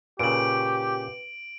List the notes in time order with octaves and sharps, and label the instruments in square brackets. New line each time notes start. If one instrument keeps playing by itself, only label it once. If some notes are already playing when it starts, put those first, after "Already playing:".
[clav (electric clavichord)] A#2 C#3 [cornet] G4 [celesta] B4 [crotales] D7 F#7